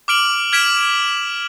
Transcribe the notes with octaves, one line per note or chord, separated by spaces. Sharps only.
D6 F6 D7 F#7
F6 G#6 B6 D7 E7 F#7